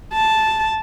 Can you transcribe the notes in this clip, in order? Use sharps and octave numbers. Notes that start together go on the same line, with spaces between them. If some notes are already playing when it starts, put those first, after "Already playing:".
A5